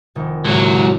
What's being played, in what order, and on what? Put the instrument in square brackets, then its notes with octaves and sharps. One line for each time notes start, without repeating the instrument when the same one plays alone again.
[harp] F1 D#3
[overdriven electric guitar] C#2 F#3 [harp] A2